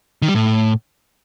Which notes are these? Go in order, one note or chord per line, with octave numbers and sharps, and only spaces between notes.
D#3
G3
A2